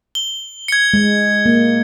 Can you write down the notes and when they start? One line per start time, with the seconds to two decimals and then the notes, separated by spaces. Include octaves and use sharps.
0.15 G7
0.68 G#6 C#7
0.94 G#3
1.46 A#3